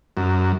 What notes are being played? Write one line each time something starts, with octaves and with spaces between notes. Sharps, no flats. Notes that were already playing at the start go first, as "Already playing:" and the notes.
F#2